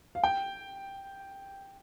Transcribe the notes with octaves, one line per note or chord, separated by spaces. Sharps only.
F5
G5